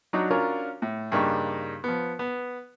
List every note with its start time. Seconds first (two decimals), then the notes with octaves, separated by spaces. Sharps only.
0.13 F#3 D4 D#4 F#4
0.30 C#4 D4 F4 F#4 A#4 C#5
0.82 A2
1.12 G2 C#3 A#3 D4 D#4 C#6
1.84 F3 B3
2.19 B3